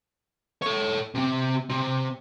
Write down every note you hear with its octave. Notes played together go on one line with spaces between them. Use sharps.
A4 C#5
C3 C4
C3